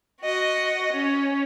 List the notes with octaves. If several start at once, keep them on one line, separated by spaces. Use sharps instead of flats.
F#4 D#5
C#4